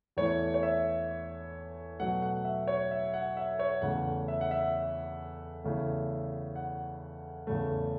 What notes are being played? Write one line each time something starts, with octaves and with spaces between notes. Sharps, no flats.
E2 E3 A3 E4 C#5
C#5
E5
B2 F#3 A3 F#5
F#5
E5
C#5
E5
F#5
E5
C#5
E2 C#3 A3 F#5
E5
F#5
E5
E2 C#3 A3 E4
F#5
E2 C#3 A3